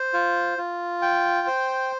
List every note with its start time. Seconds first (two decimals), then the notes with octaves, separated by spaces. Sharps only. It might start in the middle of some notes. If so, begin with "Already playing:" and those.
Already playing: C5
0.14 F4
0.58 F4
1.02 G5
1.47 C5